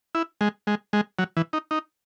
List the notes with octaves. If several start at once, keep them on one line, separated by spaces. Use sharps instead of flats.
E4
G#3
G#3
G#3
F#3
E3
D#4
D#4